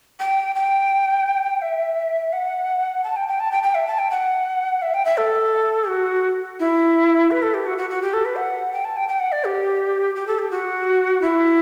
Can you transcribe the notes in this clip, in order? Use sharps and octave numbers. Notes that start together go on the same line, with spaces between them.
G5
G5
E5
F#5
A5
G5
G5
A5
G5
G5
E5
A5
G5
F#5
E5
G5
E5
A4
F#4
E4
B4
A4
G4
F#4
F#4
F#4
G4
A4
B4
F#5
G5
A5
G5
G5
F#5
D5
G4
G4
A4
G4
F#4
E4